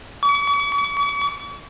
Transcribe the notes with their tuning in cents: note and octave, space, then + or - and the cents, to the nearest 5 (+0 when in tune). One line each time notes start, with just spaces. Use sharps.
C#6 +45